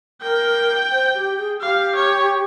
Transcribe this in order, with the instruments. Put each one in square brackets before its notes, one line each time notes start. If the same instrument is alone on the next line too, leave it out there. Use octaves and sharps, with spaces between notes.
[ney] A#4 [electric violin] G5
[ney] C5
G4
G#4
[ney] G4 [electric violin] F5
[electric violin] C#5